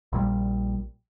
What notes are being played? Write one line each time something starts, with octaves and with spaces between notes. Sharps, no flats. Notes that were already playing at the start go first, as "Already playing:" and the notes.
A#1 A#2 G3